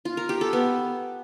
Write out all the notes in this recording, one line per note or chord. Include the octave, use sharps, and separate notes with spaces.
F4
A#4
G4
A4
B3